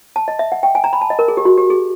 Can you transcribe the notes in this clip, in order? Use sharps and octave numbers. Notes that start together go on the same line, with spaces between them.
A5
D#5
E5
F#5
G5
G#5
A#5
B5
A5
D#5
A#4
G#4
G4
F#4
G4
G#4